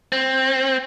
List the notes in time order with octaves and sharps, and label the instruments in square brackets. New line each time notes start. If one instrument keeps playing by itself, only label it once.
[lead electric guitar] C4